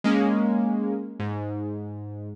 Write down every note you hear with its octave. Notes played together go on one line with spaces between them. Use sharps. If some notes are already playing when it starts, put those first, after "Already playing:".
G#3 A#3 C#4
G#2